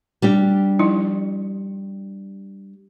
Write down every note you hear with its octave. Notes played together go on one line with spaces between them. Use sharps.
G3 D4 G4
F3 D#4 E4